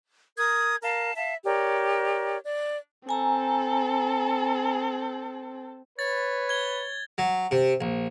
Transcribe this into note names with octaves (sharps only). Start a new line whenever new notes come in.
A#4 D#6 G#6
A#4 F5 A5
E5 F5 A5
G4 A#4 C#5 D5
D5
C4 A4 G#5 A#5
B4 C#5 A6
G#6 G7
F#3
C3
A#1